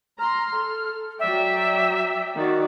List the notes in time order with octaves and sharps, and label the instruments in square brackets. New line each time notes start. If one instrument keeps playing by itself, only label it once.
[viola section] A#5 C6 [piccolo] F6
[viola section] A4
[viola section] F#3 D5 G5 [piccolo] E5
[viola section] D#3 F#4 D5